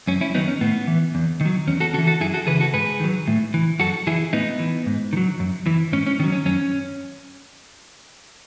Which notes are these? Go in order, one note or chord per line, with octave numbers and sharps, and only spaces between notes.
F#2 C#4
C#4 E4
D#3 F#3 B3 D#4
C#4
A2 B3
E3
E2
D#3 F#3
E2 C#4
F#4 A4
C#3 F#4 A4
E3
F#4 A4
F#2 E4 G#4
F#4 A4
C#3 E3 G#4 B4
F#4 A4
G#2 G#4 B4
D#3 F#3
A2
E3
F#2 F#4 A4
E3 E4 G#4
A2 B3 D#4
E3
G#2
D#3
F#3
F#2
E3
G#2 C#4
C#4
D#3 F#3 C#4
C#4
F#2 C#4